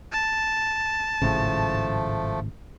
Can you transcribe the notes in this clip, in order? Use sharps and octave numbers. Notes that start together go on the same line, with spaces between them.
A5
G#1 A2 C#3 F3 A3